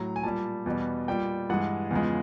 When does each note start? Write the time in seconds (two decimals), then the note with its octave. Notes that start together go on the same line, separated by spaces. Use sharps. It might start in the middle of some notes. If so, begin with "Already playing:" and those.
Already playing: A2 F#3 A#5
0.16 G#5
0.23 A#2 G3 A5
0.66 E2 B2 G3
1.08 A#2 G3 G5
1.49 G2 E3 G#3 F#5
1.91 E2 C#3 F3 G#3